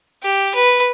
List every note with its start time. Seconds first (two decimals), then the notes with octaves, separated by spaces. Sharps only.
0.23 G4
0.55 B4